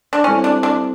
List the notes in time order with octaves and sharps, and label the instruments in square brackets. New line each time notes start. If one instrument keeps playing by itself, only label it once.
[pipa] D4
[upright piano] G3 C4 E4 A4 [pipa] C#4
[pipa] D4
D4